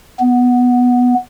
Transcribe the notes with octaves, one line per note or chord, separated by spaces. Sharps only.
B3